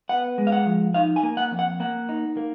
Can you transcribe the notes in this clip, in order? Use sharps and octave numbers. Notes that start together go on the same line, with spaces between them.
B3 F#5
G#3
F5
F#5
F3
D#4 F5
G#5
A#3
F#5
F2
F#5
A#3 F#5
D#4
A#3